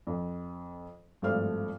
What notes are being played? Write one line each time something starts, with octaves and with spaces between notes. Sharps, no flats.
F2
G#1 G2 F3 A3 F6